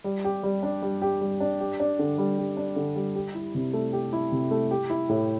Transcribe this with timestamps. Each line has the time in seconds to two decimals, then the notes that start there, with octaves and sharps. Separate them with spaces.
0.04 G3
0.24 G4
0.43 G3
0.63 D4
0.82 G3
1.02 G4
1.21 G3
1.40 D4
1.60 G4
1.80 D4
1.99 D3
2.18 G3
2.38 G4
2.57 D4
2.76 D3
2.96 G3
3.15 G4
3.35 E4
3.55 C3
3.73 A3
3.93 G4
4.13 E4
4.32 C3
4.51 A3
4.71 G4
4.90 E4
5.09 A2